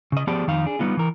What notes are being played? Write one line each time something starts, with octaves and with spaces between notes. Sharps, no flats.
C#3 D#5
F3 B3 G4 G#4 D5 A5
F2 D#3 D#4 F5
D4 G#4
G3 B3 D#4 F4
E3 A#4